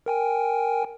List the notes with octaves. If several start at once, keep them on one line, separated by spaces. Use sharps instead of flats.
A#4 G5 G#5